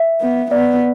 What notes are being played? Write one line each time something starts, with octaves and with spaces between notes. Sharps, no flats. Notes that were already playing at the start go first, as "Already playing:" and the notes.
Already playing: E5
B3
B3 D5